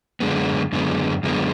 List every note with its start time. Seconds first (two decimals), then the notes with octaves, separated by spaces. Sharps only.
0.20 F#2 D3 G#3 B3
0.72 F#2 D3 G#3 B3
1.23 F#2 D3 G#3 B3